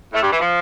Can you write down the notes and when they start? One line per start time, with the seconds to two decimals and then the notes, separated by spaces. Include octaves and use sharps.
0.13 A2 A3
0.22 G2 G3
0.32 E3
0.41 F3